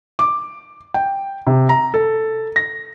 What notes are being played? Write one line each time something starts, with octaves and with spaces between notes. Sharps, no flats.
D6
G5
C3
A#5
A4
A#6